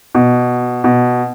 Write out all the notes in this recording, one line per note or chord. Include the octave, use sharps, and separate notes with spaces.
B2
B2